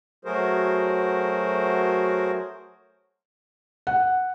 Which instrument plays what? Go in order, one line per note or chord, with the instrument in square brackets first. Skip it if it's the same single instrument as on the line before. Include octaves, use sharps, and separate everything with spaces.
[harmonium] F#3 A3 F#4 G#4 A#4 C5
[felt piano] F#5